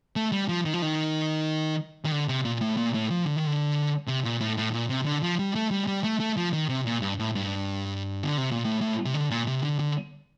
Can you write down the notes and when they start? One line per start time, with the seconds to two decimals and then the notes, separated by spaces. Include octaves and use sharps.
0.16 A3
0.32 G3
0.49 F3
0.65 D#3
0.74 F3
0.82 D#3
2.05 D#3
2.12 D3
2.28 C3
2.45 A#2
2.61 A2
2.77 A#2
2.94 A2
3.10 F3
3.26 D3
3.36 D#3
3.46 D3
4.07 C3
4.24 A#2
4.40 A2
4.57 A2
4.73 A#2
4.89 C3
5.06 D3
5.23 F3
5.39 G3
5.55 A3
5.71 G3
5.87 G3
6.04 A3
6.20 A3
6.37 F3
6.53 D#3
6.69 C3
6.86 A#2
7.02 G2
7.19 A2
7.35 G2
8.24 D3
8.38 C3
8.52 A#2
8.65 A2
8.81 A2
9.05 C3
9.14 D3
9.31 A#2
9.47 C3
9.63 D3
9.79 D3